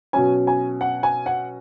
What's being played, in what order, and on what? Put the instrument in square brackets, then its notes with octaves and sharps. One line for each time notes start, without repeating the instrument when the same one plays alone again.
[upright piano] B2 F#3 C#4 G#5
G#5
F#5
G#5
F#5